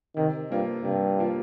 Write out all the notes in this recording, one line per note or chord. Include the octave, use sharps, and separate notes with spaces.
C3 D#3
G2 F3 A#3 F4
G2 C3
F3 A#3 F4